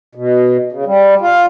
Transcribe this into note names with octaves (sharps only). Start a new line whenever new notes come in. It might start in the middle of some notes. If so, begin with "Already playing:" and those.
B2
C#3
G3
F4